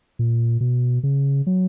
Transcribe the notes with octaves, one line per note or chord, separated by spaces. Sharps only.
A#2
B2
C#3
F#3